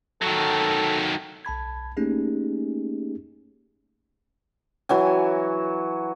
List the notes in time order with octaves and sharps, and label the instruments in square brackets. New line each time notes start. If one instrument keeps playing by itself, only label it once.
[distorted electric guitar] D#3 F#3 [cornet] A4
[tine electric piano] B1 A5 B5 G#6
A3 A#3 C#4 D#4 G4 G#4
[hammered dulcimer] E3 F#3 G#5